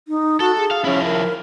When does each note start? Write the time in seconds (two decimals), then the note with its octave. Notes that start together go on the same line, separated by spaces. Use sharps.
0.08 D#4
0.40 F#4 A4
0.58 G#4
0.71 F5
0.85 F3 C#4 E4
1.04 A#4